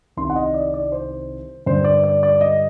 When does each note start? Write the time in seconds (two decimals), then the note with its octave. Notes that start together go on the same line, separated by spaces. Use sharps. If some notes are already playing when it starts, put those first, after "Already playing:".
0.17 C2 C3 D#3 C6
0.30 F#5
0.36 D#5
0.54 D5
0.74 D5
0.92 C5
1.66 G2 D3 C5
1.84 D5
2.04 D5
2.23 D5
2.41 D#5